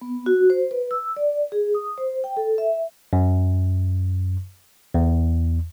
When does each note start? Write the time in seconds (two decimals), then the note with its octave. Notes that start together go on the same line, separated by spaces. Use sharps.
0.01 B3
0.26 F#4
0.50 C5
0.71 B4
0.91 E6
1.17 D5
1.52 G#4
1.75 D#6
1.98 C5
2.24 G5
2.37 A4
2.58 E5
3.13 F#2
4.94 E2